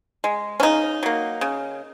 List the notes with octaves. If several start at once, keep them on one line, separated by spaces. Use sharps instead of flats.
G#3
C#4
C#3 D#4
F#3 A#3
C#3